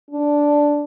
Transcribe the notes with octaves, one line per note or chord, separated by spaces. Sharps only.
D4